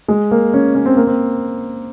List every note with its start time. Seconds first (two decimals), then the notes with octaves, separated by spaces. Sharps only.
0.08 G#3
0.31 A#3
0.54 C#4
0.75 C#4
0.86 C4
0.96 A#3
1.07 C4